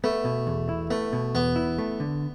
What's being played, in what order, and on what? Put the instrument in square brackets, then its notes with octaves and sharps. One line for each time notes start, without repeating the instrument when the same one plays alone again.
[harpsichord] A3 [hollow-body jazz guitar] B3
[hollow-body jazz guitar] B2
E2
E4
[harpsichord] A3 [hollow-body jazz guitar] B3
[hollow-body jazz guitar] B2
[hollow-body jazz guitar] E2 [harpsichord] B3
[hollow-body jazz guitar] E4
A3
D3